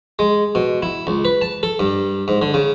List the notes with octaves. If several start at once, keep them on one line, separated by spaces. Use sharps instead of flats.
G#3
B2
E4
C#2
B4
A5
A4
G2
G#2
D3
C#3